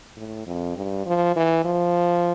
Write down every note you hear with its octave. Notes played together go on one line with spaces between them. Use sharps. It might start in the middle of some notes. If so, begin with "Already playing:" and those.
A2
F2
G2
F3
E3
F3